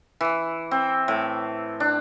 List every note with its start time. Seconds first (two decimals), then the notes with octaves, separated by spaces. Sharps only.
0.21 E3
0.71 C4
1.08 A2
1.80 D4